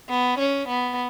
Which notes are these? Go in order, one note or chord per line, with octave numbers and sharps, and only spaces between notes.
B3
C#4
B3